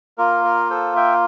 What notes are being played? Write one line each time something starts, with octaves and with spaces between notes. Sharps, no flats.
A#3 F4 A#4
A#4
A4 C5
E5 G5